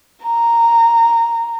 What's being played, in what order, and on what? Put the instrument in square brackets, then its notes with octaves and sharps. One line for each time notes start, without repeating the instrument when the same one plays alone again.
[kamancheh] A#5